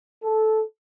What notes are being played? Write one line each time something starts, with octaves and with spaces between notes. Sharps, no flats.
A4